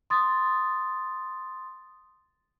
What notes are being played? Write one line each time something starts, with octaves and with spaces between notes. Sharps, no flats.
C6 D#6 A6